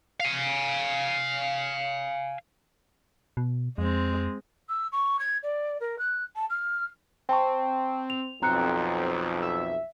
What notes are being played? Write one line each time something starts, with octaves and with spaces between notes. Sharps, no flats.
F5 G#5
B2
F2 G#3 C4
E6
C#6
G#6
D5
A#4
F#6
A5
F6
C4 G5 A5 C#6
F7
B1 F2 C4 A#5 F#6 C#7
E5